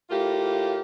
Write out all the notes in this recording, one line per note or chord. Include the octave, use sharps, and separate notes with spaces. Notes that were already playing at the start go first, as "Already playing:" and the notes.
A2 A#3 F4 G4